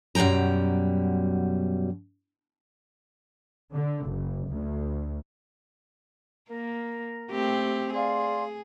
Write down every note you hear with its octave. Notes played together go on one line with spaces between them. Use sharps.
F#2 B2 G3 G5 A#5
D3
F#1
D2
A#3 A#4
A3 C4 G4
G#4 D5 F5 C6